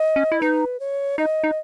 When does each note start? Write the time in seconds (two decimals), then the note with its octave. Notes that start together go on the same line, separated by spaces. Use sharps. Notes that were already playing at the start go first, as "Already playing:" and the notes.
Already playing: D#5
0.16 C#4
0.32 E4
0.41 D#4 B4
0.80 C#5
1.18 D#4 D#5
1.44 D#4